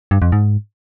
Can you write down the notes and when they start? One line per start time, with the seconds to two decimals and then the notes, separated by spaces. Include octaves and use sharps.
0.11 G2
0.22 F2
0.32 G#2